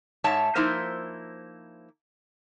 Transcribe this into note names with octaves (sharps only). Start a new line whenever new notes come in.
G#2 C#5 E5 A5
F3 A#3 D#4 E4 C5